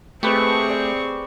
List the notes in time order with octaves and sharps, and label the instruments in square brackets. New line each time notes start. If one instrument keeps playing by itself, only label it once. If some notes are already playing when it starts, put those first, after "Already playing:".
[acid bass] A3 [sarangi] C4 [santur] G4 B4 D#5 [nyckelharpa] G#4 C#6
[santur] D5 G5